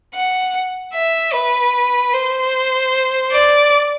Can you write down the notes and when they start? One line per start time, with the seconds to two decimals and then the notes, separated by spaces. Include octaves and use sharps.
0.15 F#5
0.93 E5
1.33 B4
2.13 C5
3.32 D5